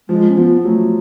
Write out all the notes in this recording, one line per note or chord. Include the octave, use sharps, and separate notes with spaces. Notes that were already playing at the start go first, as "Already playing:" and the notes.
F3 G#3
C#4
F3 B3
F#3 A3